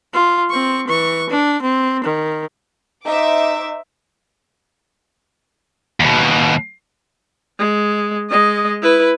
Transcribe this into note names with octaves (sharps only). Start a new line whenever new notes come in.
F4
C4 C#6
E3 C#6
D4
C4
D#3
D#4 C5 E5 D6
D#2 B2
G#3
G#3 D#5
E4 B4